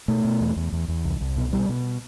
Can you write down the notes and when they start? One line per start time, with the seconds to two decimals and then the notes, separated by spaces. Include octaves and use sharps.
0.08 B2 A3
0.25 B2
0.41 E2
0.56 E2
0.73 E2
0.89 E2
1.05 C2
1.21 C2
1.37 B2
1.53 B2 G3
1.69 B2